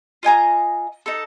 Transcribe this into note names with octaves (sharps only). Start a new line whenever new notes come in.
F4 D#5 G#5 A#5
D#4 A4